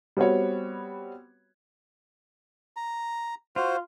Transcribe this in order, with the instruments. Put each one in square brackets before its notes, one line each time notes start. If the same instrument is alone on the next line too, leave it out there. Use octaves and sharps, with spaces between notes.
[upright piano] G3 B3 C4 F#4 C#5
[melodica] A#5
[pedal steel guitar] F4 [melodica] F#4 C5